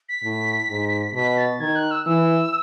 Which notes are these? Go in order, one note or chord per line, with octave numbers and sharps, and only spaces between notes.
B6
A2
G#2
B2 B6
A6
D#3 G#6
F#6
E6
E3 E6